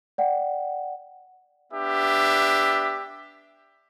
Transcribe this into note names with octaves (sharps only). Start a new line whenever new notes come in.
D5 F#5 G5
B3 D4 G4 E5